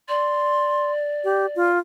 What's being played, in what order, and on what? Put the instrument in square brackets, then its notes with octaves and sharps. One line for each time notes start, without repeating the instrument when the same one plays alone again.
[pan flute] D5 [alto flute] C6
[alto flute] G4
F4